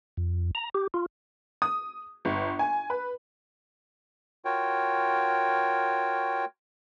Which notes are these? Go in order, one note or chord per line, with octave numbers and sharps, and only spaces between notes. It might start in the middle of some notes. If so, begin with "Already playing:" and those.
F2
A#5
G4
F4
D#6
G1
G#5
B4
F4 F#4 A#4 C#5 G5